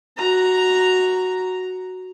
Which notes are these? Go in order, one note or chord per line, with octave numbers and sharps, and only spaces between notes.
F#4 A#5